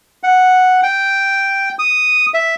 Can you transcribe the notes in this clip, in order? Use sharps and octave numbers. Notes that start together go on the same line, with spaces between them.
F#5
G5
D#6
E5